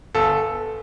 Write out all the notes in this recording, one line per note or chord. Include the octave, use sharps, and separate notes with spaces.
G1 A4